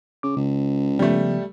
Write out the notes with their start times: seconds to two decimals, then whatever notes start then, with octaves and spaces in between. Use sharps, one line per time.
0.23 C#3 D6
0.37 C#2 C#3
0.99 C#3 F3 G3 A3 B3